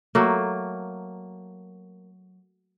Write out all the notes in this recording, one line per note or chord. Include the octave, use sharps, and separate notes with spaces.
F#3 A3 A#3